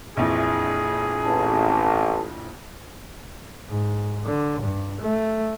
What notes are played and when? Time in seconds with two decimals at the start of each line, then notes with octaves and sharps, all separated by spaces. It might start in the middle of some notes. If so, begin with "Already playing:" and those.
0.17 A#1 F2 E3 G#4
1.23 A1 A5
3.69 G#2
4.27 D3
4.61 G2
5.02 A3